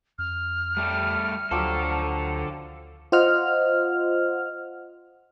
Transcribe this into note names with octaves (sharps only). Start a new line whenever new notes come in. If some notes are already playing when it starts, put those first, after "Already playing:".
F2 F6
G3 A3 G4
D2 D3 F3 F#3 G4 A4
F4 C5 D#5 F#5 F6